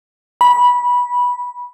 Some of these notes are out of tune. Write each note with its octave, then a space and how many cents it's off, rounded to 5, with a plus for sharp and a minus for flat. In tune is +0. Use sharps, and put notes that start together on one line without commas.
B5 -15